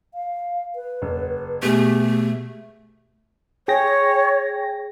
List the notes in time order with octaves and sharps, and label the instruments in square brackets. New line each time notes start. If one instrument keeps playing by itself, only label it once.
[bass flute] F5
B4
[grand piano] F#1
[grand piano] B2 G#4 [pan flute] A3 [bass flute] G4
[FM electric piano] G#4 G5 A#6 [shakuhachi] C#5